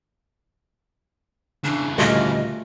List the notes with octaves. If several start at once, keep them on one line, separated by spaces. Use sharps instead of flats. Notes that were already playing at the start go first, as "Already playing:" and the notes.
C#3 E3 D4
D2 A#2 G3 A3 F4 A#4 D#5